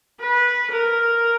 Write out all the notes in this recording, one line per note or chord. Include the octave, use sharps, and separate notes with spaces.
B4
A#4